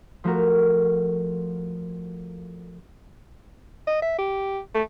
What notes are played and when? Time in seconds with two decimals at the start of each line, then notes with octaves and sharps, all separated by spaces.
0.24 F3 A3 F#4 A#4
3.87 D#5
4.02 E5
4.19 G4
4.74 A3